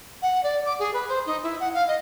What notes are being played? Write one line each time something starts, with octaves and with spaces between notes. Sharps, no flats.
F#5
D5
D6
G#4
B4
C5
D#4
E4
F#5
F5
D#5